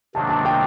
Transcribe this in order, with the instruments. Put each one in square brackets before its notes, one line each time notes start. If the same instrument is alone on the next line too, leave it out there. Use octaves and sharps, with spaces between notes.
[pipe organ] C3 D#3 F#3 A#3 D4 [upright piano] A5
[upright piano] A5
G5